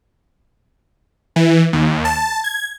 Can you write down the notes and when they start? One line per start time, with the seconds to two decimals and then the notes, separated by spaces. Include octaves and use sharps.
1.36 E3
1.73 D#2
2.05 A5
2.44 G#6